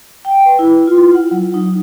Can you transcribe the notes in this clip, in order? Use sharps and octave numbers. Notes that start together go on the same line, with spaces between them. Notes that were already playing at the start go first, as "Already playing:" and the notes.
G5
B4
E4
F4
F#5
F#3
D#4